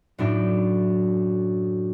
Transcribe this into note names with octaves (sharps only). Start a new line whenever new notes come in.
F#2 A2 D4